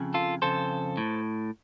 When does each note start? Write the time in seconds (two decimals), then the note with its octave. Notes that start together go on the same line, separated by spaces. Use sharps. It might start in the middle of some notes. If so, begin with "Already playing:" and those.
Already playing: F2 C#3
0.14 F4 A4
0.42 F2 C#3 A4 C5
0.97 A2